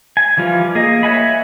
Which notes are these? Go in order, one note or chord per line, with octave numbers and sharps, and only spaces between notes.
G#5
E3 F3 G3 F4
A#3 G#4 D#5
C#5 E5 F#5 G#5 B5